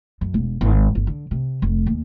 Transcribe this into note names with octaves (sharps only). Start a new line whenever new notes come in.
F#2
E1
G#1
G1
D3
C3
F1
D#2